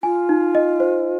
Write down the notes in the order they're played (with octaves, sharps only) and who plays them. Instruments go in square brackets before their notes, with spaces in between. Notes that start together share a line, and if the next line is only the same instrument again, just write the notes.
[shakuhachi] F4 [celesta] G#5
[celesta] D#4
D#5
C5